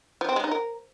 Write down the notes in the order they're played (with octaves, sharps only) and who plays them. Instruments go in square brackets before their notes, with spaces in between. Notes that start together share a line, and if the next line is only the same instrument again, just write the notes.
[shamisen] F3
C4
G#3
D#4
A#4